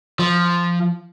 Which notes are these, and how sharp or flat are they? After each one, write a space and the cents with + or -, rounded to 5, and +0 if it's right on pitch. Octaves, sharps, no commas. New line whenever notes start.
F3 -5